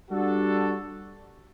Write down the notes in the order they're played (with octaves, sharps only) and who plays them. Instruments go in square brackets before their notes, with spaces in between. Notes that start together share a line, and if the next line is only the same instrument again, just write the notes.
[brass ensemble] G3 D4 F#4 A4